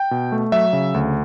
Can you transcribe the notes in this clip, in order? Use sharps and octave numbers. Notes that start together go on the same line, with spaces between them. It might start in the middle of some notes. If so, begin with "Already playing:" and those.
Already playing: G5
B2
A3
F#3 E5
C#3
D2